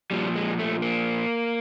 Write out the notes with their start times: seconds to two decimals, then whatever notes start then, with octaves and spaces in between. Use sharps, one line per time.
0.11 A#2 F3 G3
0.36 G#3
0.59 A3
0.82 A#3